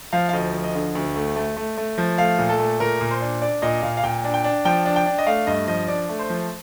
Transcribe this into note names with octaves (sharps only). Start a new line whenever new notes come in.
F3 F5
F5
D2 D#5
F3
D#5
D3
D2
A3
A3
A3
A3
F3
A3 F5
A#2
A4
A3
A#2 A#4
A#2
C5
D4
D4 D5
A#2 D#5
A#2 F5
F5
A#2 G5
D4
G5
D4
F3 G5
D4
G5
D4
D#5
A3 F5
G2 D#5
F3 D#5
D4 D5
A3
C5
F3